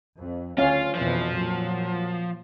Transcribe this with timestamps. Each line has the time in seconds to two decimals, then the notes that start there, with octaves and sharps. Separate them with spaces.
0.17 F2
0.58 D2 C#4 F4 F5
0.95 F2 B2 E3 F3
1.32 A#2 F#3